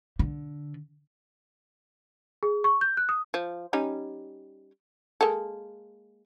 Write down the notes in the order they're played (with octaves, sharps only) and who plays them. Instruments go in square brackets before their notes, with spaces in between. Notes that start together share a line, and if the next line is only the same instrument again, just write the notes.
[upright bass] D3
[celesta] G#4
C#6
G6
F#6
D#6
[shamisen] F3
G3 C#4 D#4
G#3 A#3 A4